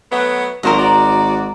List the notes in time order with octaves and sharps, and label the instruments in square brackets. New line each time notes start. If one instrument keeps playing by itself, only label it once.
[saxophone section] F#3 A3 B3
[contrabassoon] G#1 [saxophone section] A#2 C#3 F#3 [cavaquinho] A#4 C5 D#5
[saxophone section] F#4 D5 [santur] A#5